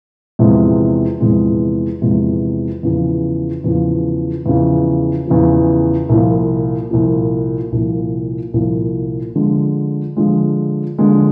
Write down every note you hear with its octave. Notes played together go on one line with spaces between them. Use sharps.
E2 C3 F3 G#3
E2 C3 F3 G#3
E2 C3 F3 G#3
E2 C#3 F3
E2 C#3 F3
E2 C#3 F3
E2 C#3 F3
C2 A#2 F3
C2 A#2 F3
C2 A#2 F3
C2 A#2 F3
D3 F3 G#3
D3 F3 G#3
D3 F3 G#3